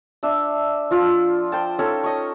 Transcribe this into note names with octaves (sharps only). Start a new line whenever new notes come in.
D4 E5
F3 F4 E6
C5 G5 A5
C#4 D#4 A4
C#5 D#5